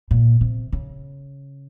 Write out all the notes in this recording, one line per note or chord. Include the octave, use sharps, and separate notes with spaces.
A#2
C3
C#3